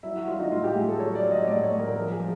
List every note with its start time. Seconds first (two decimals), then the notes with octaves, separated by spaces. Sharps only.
0.03 F#3 E4
0.16 F#4
0.28 F#3 F4
0.39 D#4
0.51 A2 F4
0.64 G4
0.76 A2 G#4
0.88 A4
0.99 F#3 C#5
1.15 D5
1.23 F#3
1.31 D#5
1.43 C#5
1.47 A2 D5
1.63 C#5
1.71 A2
1.79 A#4
1.96 F3 A#4
2.12 G#4
2.20 F3